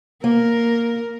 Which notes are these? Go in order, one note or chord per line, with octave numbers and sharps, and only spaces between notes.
A#3 A#4